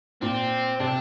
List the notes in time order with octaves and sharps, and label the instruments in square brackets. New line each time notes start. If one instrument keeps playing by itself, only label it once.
[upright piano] A#2 [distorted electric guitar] C4
[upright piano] C3 [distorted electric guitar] D4